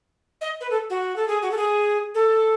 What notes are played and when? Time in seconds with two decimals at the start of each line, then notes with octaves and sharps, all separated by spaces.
0.41 D#5
0.61 B4
0.70 A4
0.90 F#4
1.16 A4
1.28 G#4
1.42 F#4
1.51 A4
1.57 G#4
2.15 A4